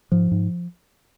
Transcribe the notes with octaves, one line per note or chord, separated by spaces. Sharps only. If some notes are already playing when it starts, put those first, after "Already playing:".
G#2 F3
G#2